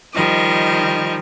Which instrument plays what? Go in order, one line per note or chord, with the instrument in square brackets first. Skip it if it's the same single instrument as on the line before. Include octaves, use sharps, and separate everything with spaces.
[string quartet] D#3 F3 G3 D#5